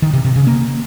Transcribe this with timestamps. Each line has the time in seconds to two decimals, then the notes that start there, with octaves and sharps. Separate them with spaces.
0.02 D#3
0.13 C3
0.25 C3
0.36 C#3
0.47 A#3